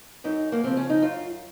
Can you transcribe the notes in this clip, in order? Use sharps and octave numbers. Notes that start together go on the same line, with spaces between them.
F#2 D#4
A#3
C#3 F3 C4
C#4
D#4
F#2 F4